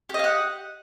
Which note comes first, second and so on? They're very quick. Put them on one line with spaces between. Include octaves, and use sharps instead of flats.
G4 D#5 F5 F#5